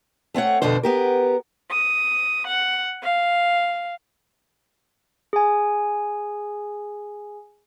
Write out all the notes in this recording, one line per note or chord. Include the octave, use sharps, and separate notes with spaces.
A3 C4 C#5 F#5
F2 B2 D3 D4 C5
B3 G4 A#4
D#6
F#5
F5
G#4 G#5